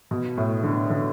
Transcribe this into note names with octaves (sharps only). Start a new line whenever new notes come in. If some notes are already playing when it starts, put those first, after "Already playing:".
B2
A2
D3
D3